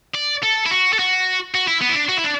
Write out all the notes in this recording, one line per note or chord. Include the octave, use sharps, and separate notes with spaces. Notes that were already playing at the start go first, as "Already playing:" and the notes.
D5
A4
E4
F#4
A4
F#4
F#4
E4
B3
E4
D4
F#4
E4
D4